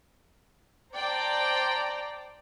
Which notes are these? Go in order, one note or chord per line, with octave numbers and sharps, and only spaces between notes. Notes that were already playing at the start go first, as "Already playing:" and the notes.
C5 D5 G5 A5 A#5 D6